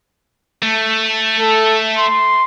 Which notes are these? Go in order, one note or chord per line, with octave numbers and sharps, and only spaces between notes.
A3
A4
C6